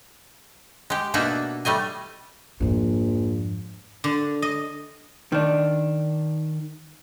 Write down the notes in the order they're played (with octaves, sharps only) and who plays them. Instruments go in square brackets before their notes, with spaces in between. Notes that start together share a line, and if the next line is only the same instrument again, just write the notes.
[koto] G#3 G4
B2 A#3 D4 D#4 E5 F#5
G3 A3 D#5 G#5
[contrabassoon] A#1 [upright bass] F2 G#2
[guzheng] D3
D#5
[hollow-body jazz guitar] D#3 D4